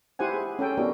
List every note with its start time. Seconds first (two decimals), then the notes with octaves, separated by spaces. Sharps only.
0.19 E4 G4 C5 F#5 G#5
0.34 G#4
0.59 C#4 A4 G5
0.77 B3 D4 E4 F#4 G4 A#4